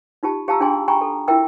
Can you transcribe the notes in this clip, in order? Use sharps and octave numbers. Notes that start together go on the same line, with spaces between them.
D#4 F4 G4 A5
G4 F5 A5 A#5 E6
D4 F4 G#4 G5 G#5 C6
G5 G#5 A#5 B5 C#6
A4
E4 F4 A#4 E5 G5 E6